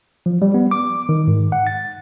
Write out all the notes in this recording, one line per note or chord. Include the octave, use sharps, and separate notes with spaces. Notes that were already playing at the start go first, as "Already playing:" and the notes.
F3
G3
B3
D6
D#3
G#2
F#5
A6